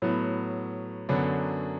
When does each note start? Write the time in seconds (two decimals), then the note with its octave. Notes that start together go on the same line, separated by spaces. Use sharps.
0.02 A2 F#3 B3
1.09 F#2 D3 F#3 B3 D4